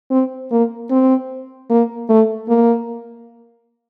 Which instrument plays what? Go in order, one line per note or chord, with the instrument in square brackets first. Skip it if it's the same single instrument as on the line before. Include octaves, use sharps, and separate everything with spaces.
[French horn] C4
A#3
C4
A#3
A3
A#3